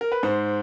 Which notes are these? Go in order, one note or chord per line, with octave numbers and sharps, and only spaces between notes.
A#4
B4
G#2 C5